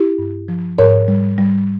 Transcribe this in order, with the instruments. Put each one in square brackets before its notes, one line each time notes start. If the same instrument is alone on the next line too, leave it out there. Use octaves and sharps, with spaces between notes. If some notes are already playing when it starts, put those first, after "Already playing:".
Already playing: [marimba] E4 G4
G2
F3
G#2 A#4 C#5
G3
G3